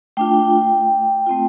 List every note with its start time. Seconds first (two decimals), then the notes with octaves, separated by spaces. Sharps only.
0.17 A3 D4 F4 G5
1.27 A3 C4 F4